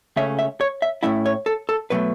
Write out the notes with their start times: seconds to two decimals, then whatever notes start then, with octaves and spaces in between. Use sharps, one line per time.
0.16 C#2 C#3 A3 C#4 E5
0.39 E5
0.61 C#5
0.82 E5
1.03 A2 A3 C#4 E4 E5
1.26 C#5
1.46 A4
1.69 A4
1.90 B2 F#3 A3 B4